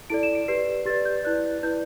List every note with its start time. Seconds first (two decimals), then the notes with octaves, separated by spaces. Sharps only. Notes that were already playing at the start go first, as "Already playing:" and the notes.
0.10 E4 A4 D5 D7
0.23 E7
0.35 D7
0.48 G4 B4 D5 C7
0.86 G4 B4 D5 A6
1.05 G6
1.24 E4 B4 D5 F#6
1.63 E4 B4 D5 G6